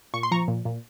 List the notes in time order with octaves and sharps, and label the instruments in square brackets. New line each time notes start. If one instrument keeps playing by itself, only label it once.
[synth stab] A#2 C#6
C6
F3 A#5 C#6
A#2
A#2